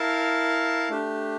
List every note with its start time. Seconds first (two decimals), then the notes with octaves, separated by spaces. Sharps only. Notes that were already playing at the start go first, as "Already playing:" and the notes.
Already playing: E4 A#4 F5 A5
0.90 A3 D4 G4